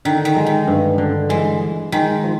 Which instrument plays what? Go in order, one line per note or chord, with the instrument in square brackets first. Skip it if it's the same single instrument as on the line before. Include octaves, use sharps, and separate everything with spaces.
[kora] D3 [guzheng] D#3
[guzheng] D#3
[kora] G#3
[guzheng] D#3
[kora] G2
D3
[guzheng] E3 [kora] G#3
[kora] G#3
[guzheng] D#3 [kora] G#3
[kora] F3